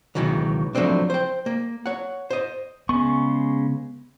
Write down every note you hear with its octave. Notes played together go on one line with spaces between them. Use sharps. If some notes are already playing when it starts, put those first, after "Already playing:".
C#2 G2 B2 D#3 E3 F#3
F3 F#3 A3 C4 D4
C5 G5
A#3
C#5 F#5
C5 D#5
C#3 G#3 B3 C#6